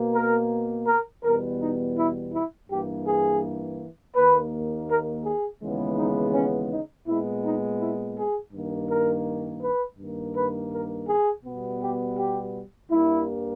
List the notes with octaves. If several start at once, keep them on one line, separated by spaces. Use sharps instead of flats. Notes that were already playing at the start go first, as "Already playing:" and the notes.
Already playing: B2 A#3
A#4
A#4
E2 B2 G3 B3 A#4
D#4
E4
E4
G2 E3 A#3 G4
G#4
D#2 D#3 A#3 B4
A#4
G#4
D#2 C#3 E3 G#3 B3
D#4
C#4
D#4
A#2 G#3 B3 E4
D#4
E4
G#4
G2 D#3 A#3
A#4
B4
G2 D#3 A#3
B4
A#4
G#4
B2 G3 B3
G4
G4
G2 G3 A#3 E4